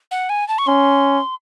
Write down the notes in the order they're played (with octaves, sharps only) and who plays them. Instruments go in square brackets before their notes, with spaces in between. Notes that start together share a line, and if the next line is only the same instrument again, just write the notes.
[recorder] F#5
G#5
A5
C#6
[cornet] C#4 [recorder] C6